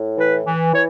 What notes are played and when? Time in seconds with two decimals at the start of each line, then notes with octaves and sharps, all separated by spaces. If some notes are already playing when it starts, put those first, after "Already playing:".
Already playing: A2
0.17 E3 B4
0.45 E3
0.73 E3 C#5